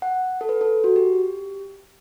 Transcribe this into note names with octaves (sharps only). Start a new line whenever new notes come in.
F#5
A4
B4
A4
F#4
G4